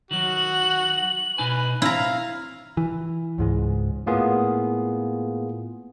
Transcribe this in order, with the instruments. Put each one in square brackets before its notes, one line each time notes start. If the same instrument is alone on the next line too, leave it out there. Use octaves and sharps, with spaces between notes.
[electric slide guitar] D#3 F#3 [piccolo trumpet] F#4 [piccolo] F#7
[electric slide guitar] B2 D#4 G#5 [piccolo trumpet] B4
[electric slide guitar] C4 [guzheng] E4 A#5 [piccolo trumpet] F5
[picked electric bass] E3
C#2 G#2 G#3
[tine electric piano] A2 A#3 B3 F4 G#4